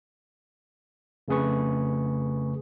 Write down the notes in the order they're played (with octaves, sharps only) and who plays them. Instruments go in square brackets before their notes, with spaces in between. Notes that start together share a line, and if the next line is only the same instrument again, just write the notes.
[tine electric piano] F2 C#3 A3 G#4 B4 C#6